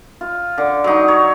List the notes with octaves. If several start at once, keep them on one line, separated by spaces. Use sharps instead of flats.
F4
D3
F#3 D#4
C#5